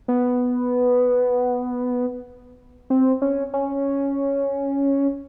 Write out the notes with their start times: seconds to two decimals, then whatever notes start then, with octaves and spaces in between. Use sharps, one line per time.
0.08 B3
2.90 C4
3.22 C#4
3.54 C#4